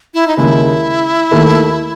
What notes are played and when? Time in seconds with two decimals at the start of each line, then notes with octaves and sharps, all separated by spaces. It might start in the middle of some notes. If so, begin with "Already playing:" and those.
0.14 E4
0.27 D#4
0.37 D#2 C#3 G#3 E4
1.31 D#2 D#3 A3